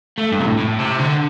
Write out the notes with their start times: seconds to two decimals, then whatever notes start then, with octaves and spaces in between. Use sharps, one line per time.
0.18 A3
0.32 G2
0.40 C3
0.46 A2
0.58 A2
0.79 C3
0.99 D3